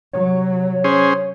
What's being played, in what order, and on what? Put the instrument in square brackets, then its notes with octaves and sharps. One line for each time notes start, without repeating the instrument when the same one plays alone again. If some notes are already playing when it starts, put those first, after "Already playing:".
[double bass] C3 F#3 [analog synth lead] C#5
[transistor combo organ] C#4 G#4 C5